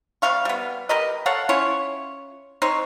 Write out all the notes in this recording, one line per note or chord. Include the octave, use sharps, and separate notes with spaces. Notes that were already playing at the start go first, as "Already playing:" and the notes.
C3 G3 F5 C#6
G3 B3
G4 A#4 B4 D#5
A4 C#5 F5 F#5
C#4 E4 F4 C#5
C4 D#4 C5 C#5